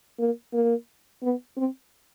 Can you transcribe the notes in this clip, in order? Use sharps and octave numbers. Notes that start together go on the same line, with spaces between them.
A#3
A#3
B3
C4